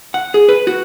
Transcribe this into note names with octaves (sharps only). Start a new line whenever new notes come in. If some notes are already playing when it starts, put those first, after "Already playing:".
F#5
G#4
B4
F#4